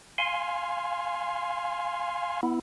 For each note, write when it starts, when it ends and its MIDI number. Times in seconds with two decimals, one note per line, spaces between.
0.18 2.41 77
0.18 2.41 80
0.18 2.41 84
2.43 2.60 59
2.43 2.60 64